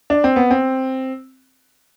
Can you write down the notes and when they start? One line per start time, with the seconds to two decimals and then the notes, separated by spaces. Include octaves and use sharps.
0.10 D4
0.24 C4
0.36 B3
0.51 C4